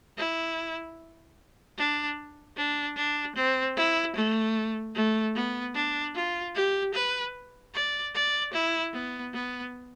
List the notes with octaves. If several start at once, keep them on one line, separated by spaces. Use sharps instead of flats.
E4
D4
D4
D4
C4
E4
A3
A3
B3
D4
F4
G4
B4
D5
D5
E4
B3
B3